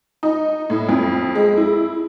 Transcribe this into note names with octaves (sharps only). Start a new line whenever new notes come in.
D#4
A2
F2
G#3
E4